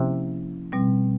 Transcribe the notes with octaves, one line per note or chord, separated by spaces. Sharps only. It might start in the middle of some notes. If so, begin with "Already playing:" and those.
Already playing: C3 F3 A#3 C#4 E4
B2 G3 C4